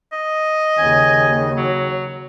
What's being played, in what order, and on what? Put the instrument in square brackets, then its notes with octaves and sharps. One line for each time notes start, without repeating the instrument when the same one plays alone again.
[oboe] D#5
[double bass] D#2 C#3 [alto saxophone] G#5
[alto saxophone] F#3